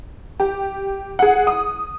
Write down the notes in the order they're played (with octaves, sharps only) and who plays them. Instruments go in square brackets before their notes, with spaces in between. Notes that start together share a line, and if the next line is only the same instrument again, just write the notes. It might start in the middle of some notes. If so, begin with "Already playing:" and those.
[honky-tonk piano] G4
G#4 F#5
D#6